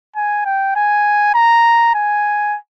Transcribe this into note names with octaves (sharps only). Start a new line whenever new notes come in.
G#5
G5
G#5
A#5
G#5